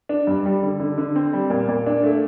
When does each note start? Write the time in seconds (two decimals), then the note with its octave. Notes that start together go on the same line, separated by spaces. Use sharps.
0.09 D4
0.27 G2
0.46 G3
0.63 D3
0.80 D3
0.98 D3
1.16 C4
1.33 G3
1.50 A#2
1.68 A#2
1.86 D4
2.03 A3